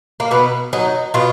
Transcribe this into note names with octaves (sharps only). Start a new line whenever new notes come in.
A#3
B2 B3
F#3 D#4
B2 F4